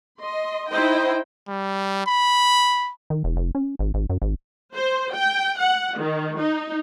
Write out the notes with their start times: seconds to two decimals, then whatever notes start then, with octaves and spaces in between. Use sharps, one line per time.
0.18 D#5 C6
0.69 D#4 E4 C5 D#5 G5
1.49 G3
2.06 B5
3.10 D#3
3.24 E1
3.36 F1
3.55 C#4
3.79 G#1
3.94 G#1
4.10 F#2
4.22 G#1
4.74 C5
5.14 G5
5.59 F#5
5.98 D#3
6.39 D#4